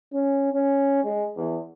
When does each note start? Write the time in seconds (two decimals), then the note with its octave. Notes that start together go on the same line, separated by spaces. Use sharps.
0.13 C#4
0.52 C#4
1.04 G#3
1.36 E2